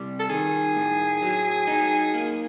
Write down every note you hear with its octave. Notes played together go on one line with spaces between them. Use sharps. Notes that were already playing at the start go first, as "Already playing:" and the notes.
Already playing: C3 G3
A4
D#3 G#4
A2
F#3
D#4
A#3